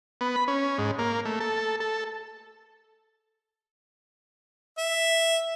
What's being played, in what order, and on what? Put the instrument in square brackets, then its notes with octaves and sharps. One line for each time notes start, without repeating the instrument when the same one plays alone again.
[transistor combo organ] B3
B5
C#4
G#2
A#3
A3
A4
A4
[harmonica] E5